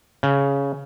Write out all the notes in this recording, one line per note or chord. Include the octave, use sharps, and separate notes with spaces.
C#3